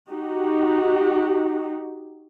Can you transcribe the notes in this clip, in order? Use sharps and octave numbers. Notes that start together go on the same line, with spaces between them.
D#4 F#4 G4